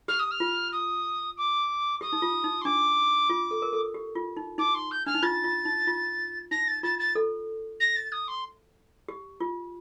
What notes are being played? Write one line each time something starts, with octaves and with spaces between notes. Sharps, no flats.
G4 F6
D#6
F6
F4
D#6
D6
G4 D#6
D#4
F4
D#4
C6
D4 D6
F4
A4
A#4
A4
G4
F4
D#4
D#4 D6
C6
G6
D4 F6
D#4
F4 A6
F4
D#4
F4
D#4 A#6
A6
F4 A6
A6
A4
A#6
A6
D#6
C6
G4
F4